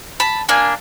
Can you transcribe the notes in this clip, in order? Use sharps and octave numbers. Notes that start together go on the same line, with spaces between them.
A5 B5
A#3 D4 G#5